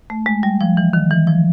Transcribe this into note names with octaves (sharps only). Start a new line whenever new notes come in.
A3
G#3
G3
F3
E3
D#3
E3
F3